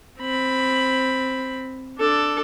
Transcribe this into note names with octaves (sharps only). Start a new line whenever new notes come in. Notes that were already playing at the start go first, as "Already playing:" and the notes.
C4 B5
D4 A4